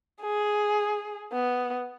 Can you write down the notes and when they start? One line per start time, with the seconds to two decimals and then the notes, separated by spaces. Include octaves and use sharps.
0.21 G#4
1.32 B3